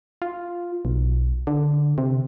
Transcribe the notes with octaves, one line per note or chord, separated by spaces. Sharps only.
F4
B1
D3
C3